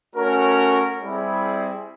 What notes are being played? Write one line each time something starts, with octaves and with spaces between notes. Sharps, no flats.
A3 C#4 F#4 A#4
G3 C4 E4 G#4